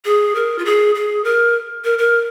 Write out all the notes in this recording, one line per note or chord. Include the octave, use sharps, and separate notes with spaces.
G#4
A#4
F4
G#4
G#4
A#4
A#4
A#4